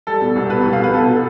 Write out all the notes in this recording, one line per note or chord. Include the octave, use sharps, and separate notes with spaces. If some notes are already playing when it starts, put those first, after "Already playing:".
G3 A4
B2
C2
B2 B4
C2
F5
B2 B4
B2 A4
B2